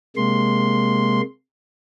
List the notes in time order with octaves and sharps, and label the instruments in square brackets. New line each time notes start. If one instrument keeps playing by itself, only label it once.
[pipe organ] C3 G#3 A#3 C6